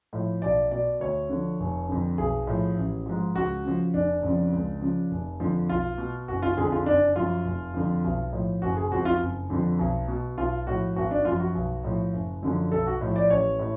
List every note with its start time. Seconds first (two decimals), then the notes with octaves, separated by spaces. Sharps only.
0.13 A2 F3
0.42 B1 D5
0.71 B2 D5
1.00 D2 C#5
1.30 D3 F3
1.60 F1
1.89 F2 D3
2.18 B1 G#4
2.47 A2 F3
2.77 A1
3.06 G#2 F3
3.35 C#2 F#4
3.64 C#3 F3
3.93 F1 D4
4.23 F2 C#3 F3
4.52 C#2
4.81 C#3 F3
5.11 F1
5.40 F2 D3 F3
5.69 B1 F4
5.98 B2
6.28 F#1 F#4
6.42 F4
6.57 F2 D3 F3 G#4
6.72 F4
6.86 F#1 D4
7.16 F#2 F3 F4
7.45 F1
7.74 F2 D3 F3
8.04 B1
8.32 A2 F3
8.62 F#1 F#4
8.77 G#4
8.92 F2 F3 F#4
9.05 F4
9.21 F#1
9.50 F2 D3 F3
9.79 B1
10.08 B2
10.37 B1 F4
10.67 A2 F3 F#4
10.96 G#1 F#4
11.11 D4
11.25 F#2 F3 F4
11.40 F#4
11.55 B1
11.84 A2 F3
12.13 F#1
12.43 F#2 D3 F3
12.72 B1 A4
12.87 F#4
13.01 A2 F3
13.16 D5
13.30 A1 C#5
13.59 A2